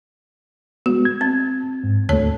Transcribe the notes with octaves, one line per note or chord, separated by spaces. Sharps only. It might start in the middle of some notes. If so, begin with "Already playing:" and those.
G#3 B3 F#4
G#6
C4
G#2
D2 A3 C#5 A5